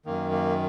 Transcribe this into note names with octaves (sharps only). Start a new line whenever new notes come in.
F#2 D#3 A#3
A#3